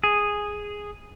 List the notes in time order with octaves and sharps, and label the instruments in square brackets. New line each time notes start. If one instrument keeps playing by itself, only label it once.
[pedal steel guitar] G#4